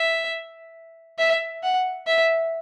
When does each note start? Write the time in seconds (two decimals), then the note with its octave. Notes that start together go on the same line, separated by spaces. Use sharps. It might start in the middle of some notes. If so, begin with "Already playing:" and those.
Already playing: E5
1.19 E5
1.63 F#5
2.07 E5